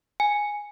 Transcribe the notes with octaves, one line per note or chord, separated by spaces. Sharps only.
G#5